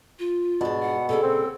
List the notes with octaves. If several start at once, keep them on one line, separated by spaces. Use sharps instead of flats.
F4
G#2 B2 D4
F#5
A#2 C#3 G#3 A4
C4